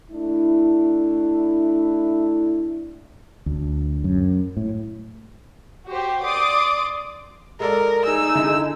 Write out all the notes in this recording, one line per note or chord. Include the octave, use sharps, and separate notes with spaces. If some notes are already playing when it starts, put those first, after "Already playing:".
A3 D4 E4
D2
F#2
A2
F#4 G4 C5
D5 C6 D6 D#6
G#3 A4 A#4 D5
D#4 G#4 E6
D3 E4